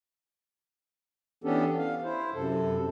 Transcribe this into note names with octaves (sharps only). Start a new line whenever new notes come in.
E3 B3 C#4 D4 G4 A4
F5
E4 C5
F#2 C3 A4